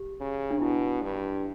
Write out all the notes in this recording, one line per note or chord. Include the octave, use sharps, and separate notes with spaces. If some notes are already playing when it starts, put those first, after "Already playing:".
Already playing: G4
C#3
D4
B2 E4
G2